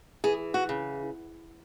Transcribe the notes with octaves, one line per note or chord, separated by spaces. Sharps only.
E3 G#4
F#4
C#3